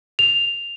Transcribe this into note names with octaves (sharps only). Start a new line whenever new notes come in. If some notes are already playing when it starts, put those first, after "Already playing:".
F7